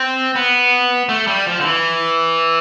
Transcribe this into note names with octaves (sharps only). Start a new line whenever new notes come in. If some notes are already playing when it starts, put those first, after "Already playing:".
Already playing: C4
B3
A3
G3
F3
D3
E3